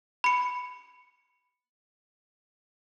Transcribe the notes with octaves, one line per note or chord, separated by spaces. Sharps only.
B5 C#7